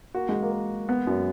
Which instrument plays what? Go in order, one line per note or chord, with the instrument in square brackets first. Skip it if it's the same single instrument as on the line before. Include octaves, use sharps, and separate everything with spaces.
[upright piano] A#3 [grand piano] F#4
[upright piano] G#3
A#3
[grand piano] A#4
B3
[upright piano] F#2